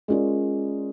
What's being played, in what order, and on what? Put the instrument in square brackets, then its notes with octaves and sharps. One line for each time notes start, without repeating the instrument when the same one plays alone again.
[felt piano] G#3 C#4 F4 A#4 D5